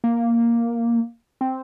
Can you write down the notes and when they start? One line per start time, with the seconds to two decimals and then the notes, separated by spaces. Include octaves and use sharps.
0.04 A#3
1.41 C4